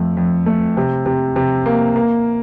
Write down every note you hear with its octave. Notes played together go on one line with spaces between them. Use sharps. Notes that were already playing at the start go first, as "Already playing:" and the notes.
Already playing: F2 A3
F2
A3
C3
C3
C3
A#3
A#3